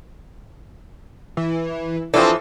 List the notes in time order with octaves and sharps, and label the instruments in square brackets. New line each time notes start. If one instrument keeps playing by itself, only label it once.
[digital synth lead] E3
[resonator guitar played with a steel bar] E3 F3 [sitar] C4 D4 [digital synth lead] A4